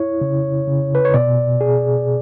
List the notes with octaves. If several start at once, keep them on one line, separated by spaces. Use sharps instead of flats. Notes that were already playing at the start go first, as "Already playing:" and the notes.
Already playing: E4 C#5
C#3
C#3
B4
C#5
B2 D5
G#4